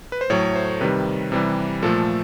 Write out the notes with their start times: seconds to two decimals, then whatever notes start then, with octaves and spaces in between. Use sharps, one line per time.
0.12 B4
0.21 C5
0.30 A2 F#3 A3 C#5
0.56 C5
0.81 C3 D#3 G3 B4
1.32 C3 E3 G3
1.83 A#2 F3 A3 A4